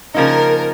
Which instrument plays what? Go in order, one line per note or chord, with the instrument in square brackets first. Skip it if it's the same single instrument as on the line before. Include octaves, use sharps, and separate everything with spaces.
[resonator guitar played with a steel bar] C#3 F3 A#3 D#4 [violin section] A#4